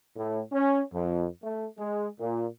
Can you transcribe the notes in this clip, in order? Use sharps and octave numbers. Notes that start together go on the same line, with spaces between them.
A2
C#4
F2
A3
G#3
A#2